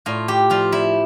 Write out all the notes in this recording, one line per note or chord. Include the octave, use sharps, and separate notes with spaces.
A2 F4
G4
F3 F4
E4